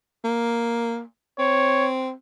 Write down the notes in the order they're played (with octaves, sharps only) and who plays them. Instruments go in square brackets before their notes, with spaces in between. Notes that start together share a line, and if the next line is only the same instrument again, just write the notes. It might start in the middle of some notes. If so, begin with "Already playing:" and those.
[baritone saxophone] A#3
[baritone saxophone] C4 [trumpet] C#5